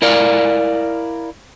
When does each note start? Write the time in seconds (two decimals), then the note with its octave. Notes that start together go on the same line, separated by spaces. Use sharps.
0.02 E4 A#4 D5 F5